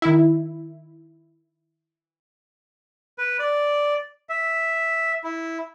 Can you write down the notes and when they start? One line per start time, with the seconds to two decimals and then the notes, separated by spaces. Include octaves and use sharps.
0.02 D#3 E4
3.18 B4
3.39 D5
4.29 E5
5.24 E4